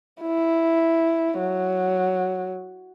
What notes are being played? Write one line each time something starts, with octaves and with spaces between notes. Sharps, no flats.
E4
F#3